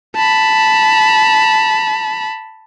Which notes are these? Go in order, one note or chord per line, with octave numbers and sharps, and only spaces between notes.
A5 B5